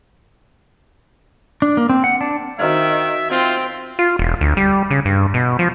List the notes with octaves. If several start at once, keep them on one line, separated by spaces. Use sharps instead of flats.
D4
A#3
C4
F#5
D4
D#3 F#4 C5 E5 F5
C4 F4
F4
E1
D2
G3
C#3
G2
B2
F3